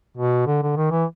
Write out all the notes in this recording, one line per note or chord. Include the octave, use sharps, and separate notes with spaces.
B2
D3
D3
D#3
E3